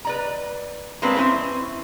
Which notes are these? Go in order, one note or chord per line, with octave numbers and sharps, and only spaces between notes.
B4 D5 A#5
G#3 A#3 C4 D4 B4 F5
E3 C4 C#4 E4